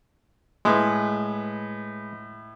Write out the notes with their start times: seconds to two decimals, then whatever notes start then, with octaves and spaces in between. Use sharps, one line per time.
0.65 A2 G#3 B4